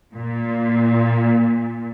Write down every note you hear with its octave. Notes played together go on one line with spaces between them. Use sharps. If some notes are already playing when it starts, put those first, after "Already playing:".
A#2